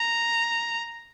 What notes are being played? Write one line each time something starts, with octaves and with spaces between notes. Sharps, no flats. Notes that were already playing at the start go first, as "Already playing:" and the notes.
Already playing: A#5